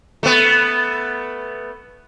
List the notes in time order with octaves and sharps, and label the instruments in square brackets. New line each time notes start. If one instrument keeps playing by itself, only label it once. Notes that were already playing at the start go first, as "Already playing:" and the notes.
[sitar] A3 B3